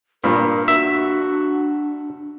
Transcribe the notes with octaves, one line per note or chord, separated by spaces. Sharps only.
G2 A#2 A#4
D4 F#4 E5